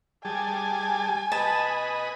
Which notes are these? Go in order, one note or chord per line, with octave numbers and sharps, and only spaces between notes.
G3 G#4 G#5 A5
B4 D#5 A5